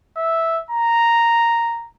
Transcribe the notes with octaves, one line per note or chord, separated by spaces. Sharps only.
E5
A#5